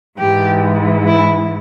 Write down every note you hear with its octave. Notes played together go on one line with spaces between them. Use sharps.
G#2 E3 G4
E4